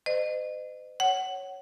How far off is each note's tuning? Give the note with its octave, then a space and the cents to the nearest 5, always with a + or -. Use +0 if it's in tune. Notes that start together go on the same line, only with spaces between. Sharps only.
C5 -45 D#5 -35
C#5 +0 F#5 +25